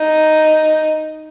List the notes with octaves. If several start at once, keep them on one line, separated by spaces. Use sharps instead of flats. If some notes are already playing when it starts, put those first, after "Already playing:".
Already playing: D#4